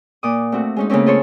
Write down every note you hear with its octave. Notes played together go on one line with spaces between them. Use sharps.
A#2 D6 D#6
A3 C4 F#4
G#3 C#4 D#4
C#3 A3 A#3 C4 C#4
F4 G#4 A4 C5 C#5